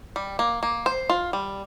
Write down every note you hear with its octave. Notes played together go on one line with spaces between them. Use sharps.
G3
A#3
A#3
C5
F4
G3